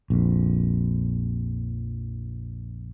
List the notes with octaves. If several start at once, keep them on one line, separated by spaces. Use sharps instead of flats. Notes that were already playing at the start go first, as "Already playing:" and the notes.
A#1 F2